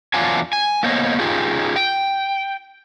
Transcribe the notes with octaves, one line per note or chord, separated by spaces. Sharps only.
E2 F3 F#3 D4 F4 G#5
G#5
A#3 B3 C5 C#5 D#5
C#4 D#4 F4 G4 G#4
G5